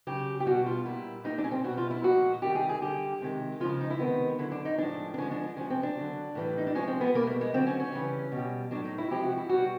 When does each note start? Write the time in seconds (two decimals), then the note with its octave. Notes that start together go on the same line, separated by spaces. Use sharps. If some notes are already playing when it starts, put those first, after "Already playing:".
0.07 C#3 F#3 G4
0.40 G4
0.46 B2 G3 F#4
0.66 F4
0.86 A#2 G3 E4
1.24 A#2 G3 D#4
1.38 D4
1.44 C#4
1.51 C4
1.64 B2 G3 F#4
1.77 F4
1.91 E4
2.03 A#2 F3 G#3 F#4
2.42 C3 D#3 G3 G4
2.55 G#4
2.69 G#4
2.81 D3 G3 G4
3.22 C3 D#3 G#3
3.60 C#3 F3 G#3 F4
3.81 D#4
3.90 E4
3.99 C3 D#3 G#3 B3
4.38 D3 F#3 E4
4.52 D4
4.65 D#4
4.78 A2 F3 G#3 D4
5.14 D4
5.18 D3 F3 G#3 C#4
5.31 D4
5.43 D4
5.56 C3 F3 G#3 C#4
5.70 C4
5.83 D4
5.97 D3 F#3
6.35 A2 E3 G3
6.58 D#4
6.67 D4
6.75 C3 F3 G#3 C#4
6.87 C4
7.01 B3
7.14 B2 G3 A#3
7.27 A3
7.41 G#3
7.53 D3 F#3 C4
7.66 C#4
7.80 C#4
7.92 C#3 E3 G3
8.32 B2 G3
8.71 A2 F#3 D4
8.85 D#4
8.98 E4
9.10 C3 F3 G#3 G4
9.23 F#4
9.37 E4
9.49 B2 G3 F#4